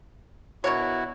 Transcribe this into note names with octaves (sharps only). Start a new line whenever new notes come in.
B2 D4 E4 F#4 A#4 C#5